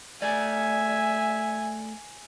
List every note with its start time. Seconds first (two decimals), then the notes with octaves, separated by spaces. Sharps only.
0.22 A3 D5 E5 G#5